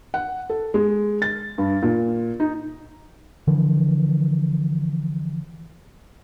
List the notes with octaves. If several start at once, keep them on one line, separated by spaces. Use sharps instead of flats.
F#5
A4
G#3
A6
G2
A#2
D#4
D3 E3 F3